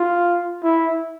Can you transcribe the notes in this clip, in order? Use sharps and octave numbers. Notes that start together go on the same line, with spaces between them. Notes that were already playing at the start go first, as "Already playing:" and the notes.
Already playing: F4
E4